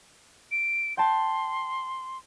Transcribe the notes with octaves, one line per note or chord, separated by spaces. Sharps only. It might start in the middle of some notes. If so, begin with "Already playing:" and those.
D7
G5 A5 C6